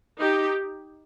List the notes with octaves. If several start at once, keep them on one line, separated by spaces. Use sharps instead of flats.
D#4 G4